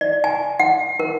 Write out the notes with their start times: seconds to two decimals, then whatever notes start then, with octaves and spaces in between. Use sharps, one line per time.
0.01 D5
0.24 G#5
0.60 F#5
1.00 A#4